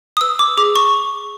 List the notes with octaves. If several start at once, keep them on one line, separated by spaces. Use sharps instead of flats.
D#6
B4 E6
D6
G#4 D6
C#6